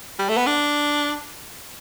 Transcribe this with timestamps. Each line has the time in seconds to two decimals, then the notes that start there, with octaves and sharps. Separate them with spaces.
0.19 G3
0.29 A3
0.37 B3
0.46 D4